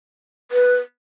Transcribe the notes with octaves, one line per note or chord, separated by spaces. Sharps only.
B4